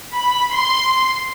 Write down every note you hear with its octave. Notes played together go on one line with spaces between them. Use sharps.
B5
C6